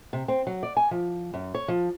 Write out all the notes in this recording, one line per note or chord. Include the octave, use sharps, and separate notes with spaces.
C3
C4
F#3
D5
G#5
F3
F#2
C#5
F3